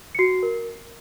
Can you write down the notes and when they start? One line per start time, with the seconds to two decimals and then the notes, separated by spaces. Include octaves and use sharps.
0.15 C#7
0.19 F#4 C7
0.43 A#4